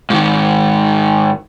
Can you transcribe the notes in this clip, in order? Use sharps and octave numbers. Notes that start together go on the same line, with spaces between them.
G#2 D#3